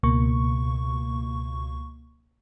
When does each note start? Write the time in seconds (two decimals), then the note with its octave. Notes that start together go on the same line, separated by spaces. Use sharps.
0.03 C#2 B2 A#3 C#6